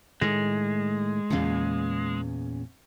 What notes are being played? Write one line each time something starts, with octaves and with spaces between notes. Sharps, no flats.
A2 D#3 G#3 A3
E2 A#2 C#3 C#4 F5